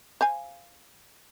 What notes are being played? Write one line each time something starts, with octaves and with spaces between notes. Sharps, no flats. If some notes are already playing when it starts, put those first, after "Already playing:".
C5 F5 G#5